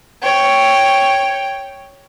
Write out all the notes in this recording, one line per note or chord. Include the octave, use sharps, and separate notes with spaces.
C#5 G5